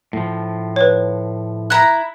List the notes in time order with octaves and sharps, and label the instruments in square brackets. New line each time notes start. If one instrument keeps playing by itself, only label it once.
[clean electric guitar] A2 F3
[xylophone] B4 C#5
[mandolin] E4 A#5 [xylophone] F#6